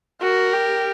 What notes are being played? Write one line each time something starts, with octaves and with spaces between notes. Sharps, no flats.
F#4 A#4
G4